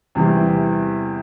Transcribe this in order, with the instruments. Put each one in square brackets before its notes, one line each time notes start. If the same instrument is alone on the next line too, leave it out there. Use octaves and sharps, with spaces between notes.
[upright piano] E2 C3 E3 G3